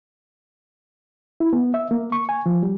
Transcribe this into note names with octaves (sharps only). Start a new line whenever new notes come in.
E4
B3
E5
A#3
C#6
G#5
F3
G3